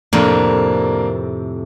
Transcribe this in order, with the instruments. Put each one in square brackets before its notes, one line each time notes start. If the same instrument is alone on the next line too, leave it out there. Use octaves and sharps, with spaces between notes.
[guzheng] F2 A2 C3 [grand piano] A#3 D4 A#4